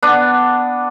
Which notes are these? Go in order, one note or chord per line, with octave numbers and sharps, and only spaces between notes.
B3 D4